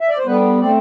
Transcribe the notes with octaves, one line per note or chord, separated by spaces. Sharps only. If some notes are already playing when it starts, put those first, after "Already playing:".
E5
D5
C5
D3 G3 B3 B4
D3 A3 C4 D5